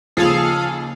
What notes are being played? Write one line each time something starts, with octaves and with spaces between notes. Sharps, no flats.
D#2 C#3 F3 G#4 A4 F5